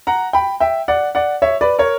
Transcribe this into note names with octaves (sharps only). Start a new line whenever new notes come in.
F#5 A#5
G5 B5
E5 G5
D5 F#5
D5 F#5
C#5 E5
B4 D5
A#4 C#5